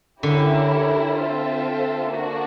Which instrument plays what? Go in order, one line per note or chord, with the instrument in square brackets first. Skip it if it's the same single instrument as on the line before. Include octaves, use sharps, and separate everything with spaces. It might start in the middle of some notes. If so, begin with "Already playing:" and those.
[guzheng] D3 [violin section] C#4 E4 G4 A#4 C#5
[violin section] C4 F4 A4 C5 E5
A#3 D4 F#4